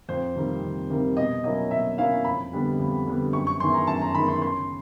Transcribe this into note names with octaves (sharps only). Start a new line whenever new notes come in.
F2 C5
C3 D#3 G3 A#3
F2
C3 D#3 G3 A#3
B2 D#5
F#3 A#3 C#4 E4 D#5
B2 E5
F#3 A#3 C#4 E4 F5
F2 B5
D3 G3 B3 D4
F2
D3 G3 B3 D4
F#2 C#6
C#6
D#3 G#3 B3 E4 C6
A#5
F#2 A5
A#5
D#3 G#3 B3 E4 B5
C6
C#3 C6